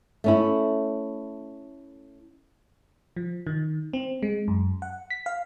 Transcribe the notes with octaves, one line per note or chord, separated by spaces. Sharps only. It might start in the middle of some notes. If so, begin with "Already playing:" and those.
A3 C#4 E4
F3
D#3
C4
G#3
F#2
F#5
B6
F5